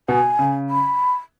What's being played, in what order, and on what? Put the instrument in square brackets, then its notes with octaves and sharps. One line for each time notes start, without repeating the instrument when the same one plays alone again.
[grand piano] B2 B3 [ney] G#5
[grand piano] C#3
[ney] B5